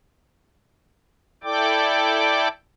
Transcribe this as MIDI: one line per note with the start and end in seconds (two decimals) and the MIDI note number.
1.43 2.48 64
1.43 2.48 69
1.43 2.48 74
1.43 2.48 79
1.43 2.48 86